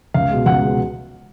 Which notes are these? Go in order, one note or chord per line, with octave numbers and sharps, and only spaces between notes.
C#2 F5
B2 G#3
C#2 F#5
B2 G#3